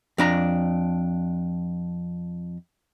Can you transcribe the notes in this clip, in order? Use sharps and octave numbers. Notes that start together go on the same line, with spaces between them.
F2 D4 A#5